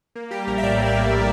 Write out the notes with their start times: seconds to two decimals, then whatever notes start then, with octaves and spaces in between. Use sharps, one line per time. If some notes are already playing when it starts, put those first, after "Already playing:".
0.15 A#3
0.31 G3 G4
0.47 A#1 A#4
0.58 E5
0.63 A2 D5
0.79 A#3
0.86 G4
0.95 G3